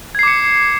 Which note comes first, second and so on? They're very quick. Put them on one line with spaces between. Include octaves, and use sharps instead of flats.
G#6 C7 D6 C#7